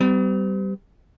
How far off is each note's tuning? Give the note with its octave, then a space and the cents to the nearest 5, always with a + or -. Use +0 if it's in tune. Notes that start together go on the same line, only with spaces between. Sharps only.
G3 -15 C4 -45